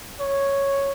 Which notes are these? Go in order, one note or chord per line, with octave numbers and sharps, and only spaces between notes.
C#5